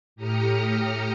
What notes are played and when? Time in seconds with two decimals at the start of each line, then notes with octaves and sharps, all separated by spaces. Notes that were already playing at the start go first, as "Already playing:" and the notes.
0.16 A2 G4 A#5 D#6 F6 C#7